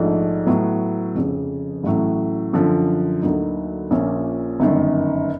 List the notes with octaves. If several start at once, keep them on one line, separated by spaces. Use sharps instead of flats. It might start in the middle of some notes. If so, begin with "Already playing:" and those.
Already playing: A#1 G#2 F3 A3 D4
A2 F#3 B3
F1 F2 C#3
A1 A2 F#3
F#2 D3 F3
D2 D3 F#3 A#3 D#4
A#1 A#2 F3 A#3 C#4
G1 F#2 D#3